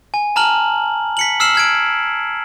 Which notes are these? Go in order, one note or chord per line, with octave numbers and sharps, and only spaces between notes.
G#5
A5 A#5 F6 F#7
B6 C#7 F#7
E6 F6 C7 E7 F#7
F6 G#6 D7